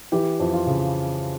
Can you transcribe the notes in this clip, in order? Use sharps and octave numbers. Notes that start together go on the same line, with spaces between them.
E3 G4
F2
F4
C#3